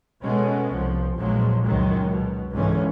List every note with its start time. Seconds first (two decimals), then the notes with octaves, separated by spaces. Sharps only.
0.22 B2 G#3 A3 B3 C#4
0.73 C2 F3
1.16 A#1 E2 A#2 F3 F#3 G#3
1.64 C#2 F#2 D#3 F#3 G#3
2.08 B2
2.52 C#2 G#2 D3 E3 C#4